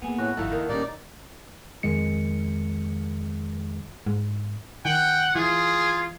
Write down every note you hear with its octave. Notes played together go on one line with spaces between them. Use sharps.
A#3 B3 G#4
A2 F#4
G1 F2 D#4 E4 F#4 A4 F5
D#2 D#3
A#2 G3 C#4 D#4 D5
F2 D#3 G#3 C#7
G#2
D#3 F#5 G5
E3 F4 G#4